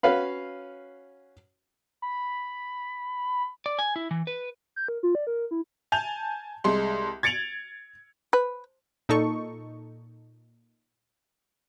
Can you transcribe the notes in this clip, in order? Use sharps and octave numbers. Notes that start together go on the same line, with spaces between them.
C#4 F#4 B4 F5 B5
B5
D5
G#5
E4
E3
B4
G6
A#4
F4
D5
A#4
E4
G#5 A5 G6 F7
C2 G#3 C6
G#6 A6 C#7 D7 F7 F#7
B4
A#2 D#4 A4 C#6